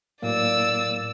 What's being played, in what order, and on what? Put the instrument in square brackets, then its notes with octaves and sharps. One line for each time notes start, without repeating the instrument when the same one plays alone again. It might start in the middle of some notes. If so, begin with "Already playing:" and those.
[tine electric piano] A2 F#3 A#3 [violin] D5 E6